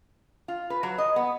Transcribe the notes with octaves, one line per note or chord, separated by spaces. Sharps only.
F4
B4
F#3
D#5
B3